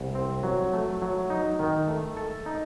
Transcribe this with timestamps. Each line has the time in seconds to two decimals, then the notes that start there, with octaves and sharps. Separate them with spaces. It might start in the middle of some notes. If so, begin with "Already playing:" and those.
Already playing: C2
0.15 C4
0.43 F#3
0.73 A3
1.02 F#3
1.30 D#4
1.60 D#3
1.88 A3
2.17 A4
2.46 D#4